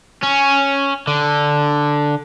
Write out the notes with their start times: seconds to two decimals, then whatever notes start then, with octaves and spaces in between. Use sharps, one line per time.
0.23 C#4
1.07 D3